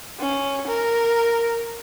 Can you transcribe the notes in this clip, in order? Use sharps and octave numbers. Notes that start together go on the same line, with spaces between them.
C#4
A#4